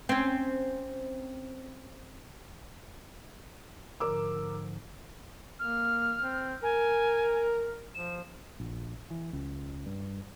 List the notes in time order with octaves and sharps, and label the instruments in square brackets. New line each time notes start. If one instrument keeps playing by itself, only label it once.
[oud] C4 C#4
[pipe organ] G#2 D3 F3 [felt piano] A#4 D6 E6
[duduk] A#3 [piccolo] F6
[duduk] C4
[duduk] A#4 [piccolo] G#5
[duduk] F3 [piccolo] E7
[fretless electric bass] A#1
E3
C#2
G2